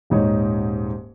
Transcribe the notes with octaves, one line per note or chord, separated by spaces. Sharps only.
D#1 G#2 D#4 C#5